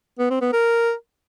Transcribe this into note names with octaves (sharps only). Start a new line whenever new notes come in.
B3
C4
B3
A#4